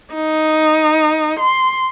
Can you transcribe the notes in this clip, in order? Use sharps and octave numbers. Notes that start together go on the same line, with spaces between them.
D#4
C6